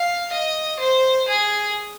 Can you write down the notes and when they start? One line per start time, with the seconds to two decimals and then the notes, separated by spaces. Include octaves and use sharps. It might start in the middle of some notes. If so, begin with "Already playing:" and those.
Already playing: F5
0.32 D#5
0.80 C5
1.28 G#4